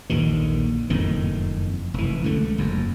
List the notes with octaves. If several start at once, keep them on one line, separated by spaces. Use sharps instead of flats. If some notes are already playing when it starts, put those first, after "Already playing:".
A#1 D#2 D3 D#3
F#1 F2 A2 D#3
F1 E3
C#2 D3 A3
F#1 F2